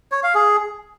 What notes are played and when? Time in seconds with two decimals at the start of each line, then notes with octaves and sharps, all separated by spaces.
0.12 C#5
0.23 F5
0.35 G#4